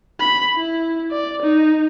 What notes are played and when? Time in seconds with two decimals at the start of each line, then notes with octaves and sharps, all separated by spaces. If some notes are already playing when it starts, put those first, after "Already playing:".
0.20 B5
0.56 E4
1.11 D5
1.42 D#4